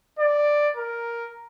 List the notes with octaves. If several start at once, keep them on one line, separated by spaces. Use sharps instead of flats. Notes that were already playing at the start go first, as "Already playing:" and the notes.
D5
A#4